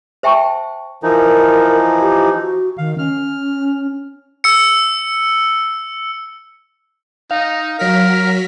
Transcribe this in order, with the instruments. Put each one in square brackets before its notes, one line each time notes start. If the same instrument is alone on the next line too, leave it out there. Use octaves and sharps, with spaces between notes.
[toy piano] C5 E5 G5 A5 C#6
[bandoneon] E3 F3 D#4 [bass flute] A#4
[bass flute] G4
F#4
[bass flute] D#3 [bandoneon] F5
[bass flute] C#4 [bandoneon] F6
[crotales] E6 C#7
[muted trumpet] D#4 [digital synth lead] F5
[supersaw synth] F#3 F6 B6 [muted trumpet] A#4